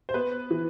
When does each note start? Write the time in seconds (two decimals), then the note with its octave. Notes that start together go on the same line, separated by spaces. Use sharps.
0.09 C5
0.14 B3 B4
0.51 E3